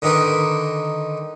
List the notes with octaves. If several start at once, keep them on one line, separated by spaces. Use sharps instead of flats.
D3 D#3 D#4 A#4 B4